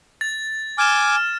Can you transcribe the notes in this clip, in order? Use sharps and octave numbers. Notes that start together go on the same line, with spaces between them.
A6
G#5 D6 F6 E7